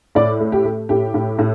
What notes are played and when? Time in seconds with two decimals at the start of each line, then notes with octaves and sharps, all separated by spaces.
0.15 A2 D5
0.40 A3
0.52 G4
0.65 A3
0.89 A2 G4
1.14 A2
1.39 A2